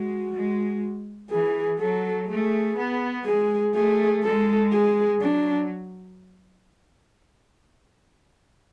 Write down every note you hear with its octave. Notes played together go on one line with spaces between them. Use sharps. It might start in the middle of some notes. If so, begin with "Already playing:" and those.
Already playing: G#3 F#4
G#3
E3 G#4
F#3 A4
A3 G#4
B3
G#3 G#4
A3 G#4
G#3 A4
G#4
F#3 D4